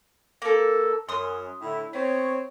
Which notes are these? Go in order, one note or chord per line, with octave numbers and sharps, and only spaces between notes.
A#3 A4
F#2 C6 D#6
A2 D3 E4
B3 C4 C#5